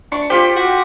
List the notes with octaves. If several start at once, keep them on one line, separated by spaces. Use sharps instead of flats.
D4 C#6
F4 G4 C5
F#4